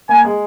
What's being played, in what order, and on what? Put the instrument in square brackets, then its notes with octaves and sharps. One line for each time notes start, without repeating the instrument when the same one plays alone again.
[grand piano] A#3 [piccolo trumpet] G#5
[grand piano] G#3